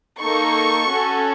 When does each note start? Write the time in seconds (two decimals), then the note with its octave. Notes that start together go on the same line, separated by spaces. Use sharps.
0.19 A#3 D#4 A4 C#6
0.89 C#4 F#4 A4